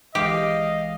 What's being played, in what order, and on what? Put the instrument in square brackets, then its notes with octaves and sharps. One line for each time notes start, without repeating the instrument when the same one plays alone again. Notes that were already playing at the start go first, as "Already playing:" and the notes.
[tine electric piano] B1 E3 G#3 [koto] G4 [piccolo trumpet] D#5 [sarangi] F5